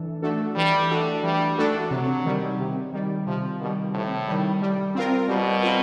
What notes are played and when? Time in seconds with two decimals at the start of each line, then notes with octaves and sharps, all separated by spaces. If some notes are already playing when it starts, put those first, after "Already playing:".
Already playing: E3 A3 D4 A4
0.22 A3 D4 F#4 A4
0.56 E3 G3
0.90 A3 D4 F#4 A4
1.23 E3 G3
1.58 A3 D4 F#4 A4
1.91 C3 F#3
2.25 D#3 G3
2.59 C3
2.93 D#3 G3
3.27 C3 F3
3.60 B2 D#3 G3
3.94 A2 C3
4.28 D#3 G3
4.62 G3
4.95 C4 F4 A#4
5.29 B2 G3
5.63 C4 F4 A#4